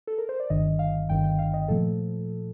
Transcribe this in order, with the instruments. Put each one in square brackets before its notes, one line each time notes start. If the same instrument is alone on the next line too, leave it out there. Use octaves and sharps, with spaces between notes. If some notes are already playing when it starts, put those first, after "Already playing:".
[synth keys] A4
A#4
C5
D5
G1 G2 D#3 D#5
F5
G1 G2 D#3 G5
G5
F5
D#5
A#2 F3 A3 A4